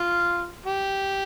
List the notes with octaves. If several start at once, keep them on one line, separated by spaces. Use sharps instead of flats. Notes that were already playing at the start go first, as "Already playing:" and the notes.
Already playing: F4
G4